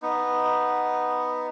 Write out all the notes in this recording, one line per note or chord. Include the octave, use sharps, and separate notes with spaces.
B3 D#4